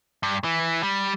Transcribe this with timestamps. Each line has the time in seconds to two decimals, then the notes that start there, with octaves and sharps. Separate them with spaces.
0.23 G2
0.44 E3
0.83 G3